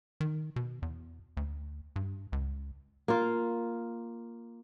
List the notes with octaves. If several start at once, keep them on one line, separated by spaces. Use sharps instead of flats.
D#3
B2
E2
D2
G2
C#2
A#3 F4